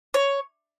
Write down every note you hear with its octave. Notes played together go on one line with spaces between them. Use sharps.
C#5